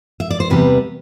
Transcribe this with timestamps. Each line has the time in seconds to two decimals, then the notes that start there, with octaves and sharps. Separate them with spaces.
0.20 E5
0.31 D5
0.40 C5
0.50 E2 C3 G3 B4